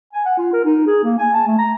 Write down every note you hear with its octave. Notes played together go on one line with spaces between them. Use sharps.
G#5
F#5
F4
A#4
D#4
G#4
A#3
G#5
A5
A3
A#5